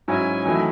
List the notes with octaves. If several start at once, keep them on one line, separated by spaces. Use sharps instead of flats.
G#2 F#3 C#4 E4 G#5
E2 D#3 F#3 A3 E4